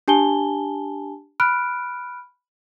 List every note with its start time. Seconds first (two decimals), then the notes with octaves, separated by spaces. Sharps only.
0.08 D4 G4 G#5 A5 G7
1.40 B5 F6 F#6 D7